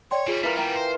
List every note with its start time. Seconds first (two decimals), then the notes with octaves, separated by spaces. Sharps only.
0.11 C#5 D5 G5 C6
0.28 E3 G3 F4 G#4
0.43 E3 G3 F4 A#4 B6
0.57 G3 B3 E5 G5 A#5
0.76 C5